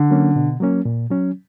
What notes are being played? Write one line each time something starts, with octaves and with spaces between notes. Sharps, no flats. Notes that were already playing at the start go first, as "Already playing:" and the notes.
Already playing: D3
F#3 A#3 C#4
B2
F#3 A#3 C#4
A#2
F#3 C#4